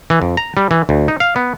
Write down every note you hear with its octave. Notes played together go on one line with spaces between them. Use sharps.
E3
F2
A#5
G3
E3
D2
D#4
F5
B3